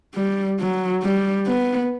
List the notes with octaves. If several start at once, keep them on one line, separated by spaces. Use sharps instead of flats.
G3
F#3
G3
B3